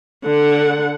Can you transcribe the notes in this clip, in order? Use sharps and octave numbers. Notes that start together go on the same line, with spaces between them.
D3 F#5